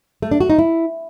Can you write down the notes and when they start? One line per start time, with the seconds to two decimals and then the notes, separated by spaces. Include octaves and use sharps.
0.22 A3
0.31 D4
0.40 F#4
0.50 D#4
0.59 E4